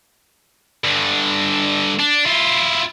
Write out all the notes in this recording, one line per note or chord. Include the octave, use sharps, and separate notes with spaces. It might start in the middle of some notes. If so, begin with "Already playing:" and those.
G2 D3
D4
E4 F4